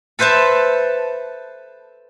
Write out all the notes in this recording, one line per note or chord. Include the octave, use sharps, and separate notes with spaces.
A4 B4 C5 E5 A5